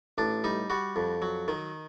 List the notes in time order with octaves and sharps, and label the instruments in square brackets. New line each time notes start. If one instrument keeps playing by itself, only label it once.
[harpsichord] A1 D4
G3 D#4
G3 F#4
F2
F#3
D#3